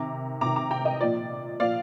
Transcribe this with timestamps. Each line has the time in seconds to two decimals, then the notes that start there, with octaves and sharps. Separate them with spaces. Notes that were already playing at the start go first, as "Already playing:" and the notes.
Already playing: C3 D#3 A#5 D6
0.41 C3 D#3 A#5 D6
0.56 A#5 D6
0.71 G5 A#5
0.85 D#5
1.01 A#2 F3 D5
1.60 A#2 F3 D5 F5